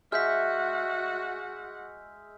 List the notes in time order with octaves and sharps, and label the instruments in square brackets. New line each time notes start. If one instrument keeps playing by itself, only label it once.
[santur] G#3 E5 [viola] F#4 F#5 [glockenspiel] F6 G6 B6